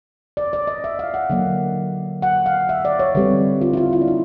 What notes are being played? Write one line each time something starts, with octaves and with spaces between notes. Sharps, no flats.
D5
D5
D#5
E5
F5
F#5
D3 F#3 A#3
F#5
F5
E5
D5
C#5
D3 G3 C4 B4
F4
E4
F4
F4
D4
D#4